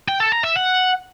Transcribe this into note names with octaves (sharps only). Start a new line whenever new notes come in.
G5
A4
A#5
E5
F#5